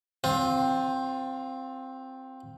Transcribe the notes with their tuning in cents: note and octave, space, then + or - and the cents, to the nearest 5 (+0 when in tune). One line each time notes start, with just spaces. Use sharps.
C4 +0 F4 +25